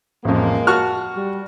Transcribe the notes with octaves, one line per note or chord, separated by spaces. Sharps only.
A1 F2 F3 G#3 A#3
F#4 A5 C#6 F6
G3